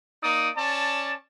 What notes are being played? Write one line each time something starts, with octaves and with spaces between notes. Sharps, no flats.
A#3 D#4 D5 D#6
C#4 D5 A5